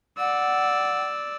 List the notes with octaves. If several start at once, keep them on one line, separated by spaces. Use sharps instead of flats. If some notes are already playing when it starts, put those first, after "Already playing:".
D5 F#5 E6